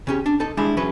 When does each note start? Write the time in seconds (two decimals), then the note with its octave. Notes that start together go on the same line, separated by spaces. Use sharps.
0.07 C#3 C#4 G4
0.26 D4
0.40 D#4 A4 A5
0.57 G3 G#3 D4 E4 G4
0.77 E2 C#3 F#3 C#4 B4